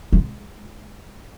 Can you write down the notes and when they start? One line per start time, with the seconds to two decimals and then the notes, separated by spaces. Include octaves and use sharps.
0.13 G#3